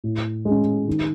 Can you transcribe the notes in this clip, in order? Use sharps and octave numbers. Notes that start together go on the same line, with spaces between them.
A2
G#3
C#4
D#3